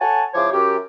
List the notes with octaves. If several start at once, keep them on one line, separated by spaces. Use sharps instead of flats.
A4 C#5 F#5 G#5 A5
C#3 F3 E4 C5 C#5 D6
F#2 G4